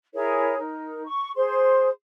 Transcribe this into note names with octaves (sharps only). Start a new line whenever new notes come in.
E4 G#4 A#4 C#5
D#4 A#4
C#6
G#4 C5 C6